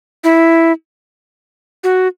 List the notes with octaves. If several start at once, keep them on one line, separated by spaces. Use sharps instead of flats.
E4
F#4